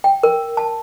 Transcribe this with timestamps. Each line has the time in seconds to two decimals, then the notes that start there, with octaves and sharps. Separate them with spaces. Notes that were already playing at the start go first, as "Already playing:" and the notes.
0.04 G5
0.23 A#4
0.57 A5